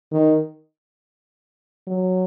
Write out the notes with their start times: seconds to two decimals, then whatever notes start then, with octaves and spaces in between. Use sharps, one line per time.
0.12 D#3
1.87 F#3